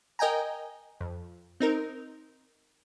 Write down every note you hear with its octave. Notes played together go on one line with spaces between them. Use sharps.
A#4 D#5 G5 G#5 A#5
F2
C4 D#4 A#4